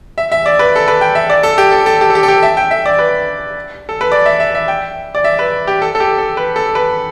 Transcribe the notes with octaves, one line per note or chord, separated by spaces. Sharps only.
E5
E5
D5
B4
A4
B4
G5
E5
D5
A4
G4
A4
A4
G4
A4
G4
A4
G4
E5
G5
E5
D5
B4
A4
B4
D5
E5
E5
E5
G5
D5
E5
B4
G4
A4
A4
G4
A4
B4
A4
B4